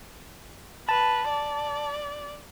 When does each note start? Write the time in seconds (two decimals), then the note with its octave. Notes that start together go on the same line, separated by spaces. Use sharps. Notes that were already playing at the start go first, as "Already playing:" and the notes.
0.89 B4 A5
1.29 D5